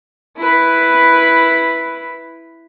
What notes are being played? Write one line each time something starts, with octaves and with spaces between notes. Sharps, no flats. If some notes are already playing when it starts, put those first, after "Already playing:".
E4 B4